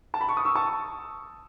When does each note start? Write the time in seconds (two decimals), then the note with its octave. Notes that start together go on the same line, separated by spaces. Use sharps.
0.14 A5
0.21 B5
0.29 C#6
0.37 D#6
0.45 C#6 E6
0.55 A5 C#6